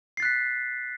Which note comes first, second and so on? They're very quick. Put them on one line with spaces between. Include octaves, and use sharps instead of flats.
C7 A6 F#6 B6